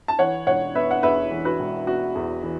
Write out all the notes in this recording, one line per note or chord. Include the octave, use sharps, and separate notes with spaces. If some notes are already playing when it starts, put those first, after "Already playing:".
A5
E3 C#5 F#5
E1 C#5 F#5
B3 B4 E5
F#5
E2 B4 E5
E3
F#4 B4
E1
B3 F#4
E2
E3